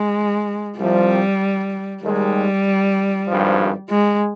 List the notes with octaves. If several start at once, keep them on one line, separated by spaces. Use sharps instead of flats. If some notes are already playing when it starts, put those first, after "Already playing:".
Already playing: G#3
C2 C3 F3 G3 C4
D#2 D#3 G3 G#3
G#1 G2 F3
G#3